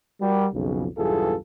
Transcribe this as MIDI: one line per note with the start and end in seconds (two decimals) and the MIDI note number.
0.21 0.47 55
0.21 0.47 66
0.21 0.47 70
0.54 0.87 35
0.54 0.87 41
0.54 0.87 49
0.98 1.36 35
0.98 1.36 40
0.98 1.36 43
0.98 1.36 65
0.98 1.36 68
0.98 1.36 69